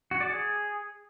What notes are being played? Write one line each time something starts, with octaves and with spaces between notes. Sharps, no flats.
F#4
D5
G#4